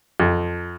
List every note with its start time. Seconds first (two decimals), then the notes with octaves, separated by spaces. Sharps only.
0.20 F2